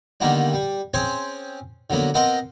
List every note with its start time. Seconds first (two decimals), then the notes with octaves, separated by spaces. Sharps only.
0.20 D3 D#3 G3 A#3 B3 D4
0.54 G3
0.94 C4 C#4 G#4 C5 C#5
1.90 D3 F#3 A#3 B3
2.14 B3 C4 A#4 D#5 F5 F#5